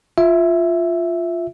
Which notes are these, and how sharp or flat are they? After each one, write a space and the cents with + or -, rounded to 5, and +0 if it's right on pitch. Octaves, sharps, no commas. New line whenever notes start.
F4 +0 E5 +0